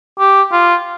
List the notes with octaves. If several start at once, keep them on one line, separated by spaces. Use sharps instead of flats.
G4
F4